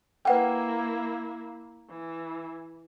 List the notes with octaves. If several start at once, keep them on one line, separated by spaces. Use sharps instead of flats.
A#3 E4 B4 F#5 G5
E3